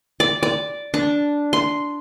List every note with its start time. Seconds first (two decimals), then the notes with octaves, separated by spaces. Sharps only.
0.20 D5
0.43 D5
0.94 D4
1.53 C6